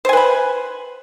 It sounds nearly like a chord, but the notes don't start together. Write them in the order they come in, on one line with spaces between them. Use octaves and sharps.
C5 G#5 B4 B5